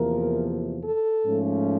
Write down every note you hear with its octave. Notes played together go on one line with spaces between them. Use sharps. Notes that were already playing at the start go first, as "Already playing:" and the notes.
Already playing: E2 C3 F3 A#3 A#4
A4
G#2 F3 A3 C#4